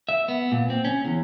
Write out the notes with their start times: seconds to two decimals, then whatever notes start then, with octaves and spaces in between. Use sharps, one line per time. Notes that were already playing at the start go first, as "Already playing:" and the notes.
0.09 E5
0.28 B3
0.52 A#2
0.70 C4
0.85 C#4
1.05 E2